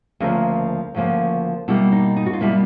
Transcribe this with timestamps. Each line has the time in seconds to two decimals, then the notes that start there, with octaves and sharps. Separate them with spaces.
0.20 D2 C#3 F3 A#3 A#4
0.95 D2 C#3 F3 A#3
1.68 B2 G3 A#3 E4
1.92 D#4
2.16 D#4
2.26 F#4
2.33 F4
2.41 B2 G3 A#3 E4